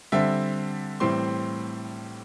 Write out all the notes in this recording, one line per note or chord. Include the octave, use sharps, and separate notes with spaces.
D3 G3 C4 E5
A2 E3 G3 C4 C6